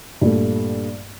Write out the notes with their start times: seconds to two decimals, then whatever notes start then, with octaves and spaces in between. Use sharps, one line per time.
0.21 G2 A#2 A3